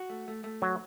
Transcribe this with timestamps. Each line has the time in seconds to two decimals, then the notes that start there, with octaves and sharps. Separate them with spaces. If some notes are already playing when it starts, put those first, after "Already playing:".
Already playing: F#4
0.10 A3
0.28 A3
0.44 A3
0.62 F#2 F#3